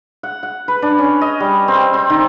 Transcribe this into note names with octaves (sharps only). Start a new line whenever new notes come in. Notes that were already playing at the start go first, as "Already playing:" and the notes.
F#5
F#5
B4
D4
C#4
D#5
G3
C4
C4
D#3